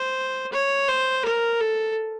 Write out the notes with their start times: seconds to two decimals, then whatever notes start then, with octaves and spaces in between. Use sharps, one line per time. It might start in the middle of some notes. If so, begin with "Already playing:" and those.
Already playing: C5
0.52 C#5
0.88 C5
1.25 A#4
1.61 A4